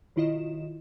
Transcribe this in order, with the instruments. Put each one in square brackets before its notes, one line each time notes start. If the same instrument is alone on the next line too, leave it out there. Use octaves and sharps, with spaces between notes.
[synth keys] B1 D#3 E4 F4 D#5 E7